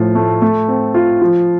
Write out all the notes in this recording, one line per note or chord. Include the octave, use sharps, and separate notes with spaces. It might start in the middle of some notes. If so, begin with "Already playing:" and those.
Already playing: A2 F3 F4
A3
A3
C4
F4
F3